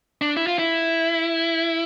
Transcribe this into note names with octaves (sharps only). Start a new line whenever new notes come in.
D4
E4
F4
E4